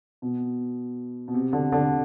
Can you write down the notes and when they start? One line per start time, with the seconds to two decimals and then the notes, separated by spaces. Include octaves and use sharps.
0.22 B2
1.28 B2
1.34 C3
1.53 D3
1.72 D3